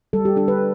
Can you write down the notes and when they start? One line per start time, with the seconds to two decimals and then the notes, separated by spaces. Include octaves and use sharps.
0.13 G3 A4
0.25 G4
0.36 D4 A4
0.48 B4